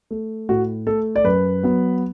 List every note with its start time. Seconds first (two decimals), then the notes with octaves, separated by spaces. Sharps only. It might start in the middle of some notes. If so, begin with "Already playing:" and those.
0.11 A3
0.49 A2 F#4
0.87 A3 A4
1.16 D5
1.24 F#2 B4
1.63 F#3 B3